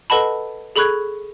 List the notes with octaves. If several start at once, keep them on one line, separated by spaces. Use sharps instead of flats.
A4 B4 D#5 F#5 A5 B5
G#4 A4 B5 C#6 F#6 G#6